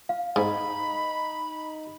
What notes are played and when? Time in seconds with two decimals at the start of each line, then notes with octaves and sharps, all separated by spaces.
0.09 F5
0.36 G#2 D#4 B5